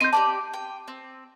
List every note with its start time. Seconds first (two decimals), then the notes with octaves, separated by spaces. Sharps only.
0.01 C4 D#4 C6 G6 D#7
0.13 G4 C5 D5 A5
0.53 G5
0.88 C4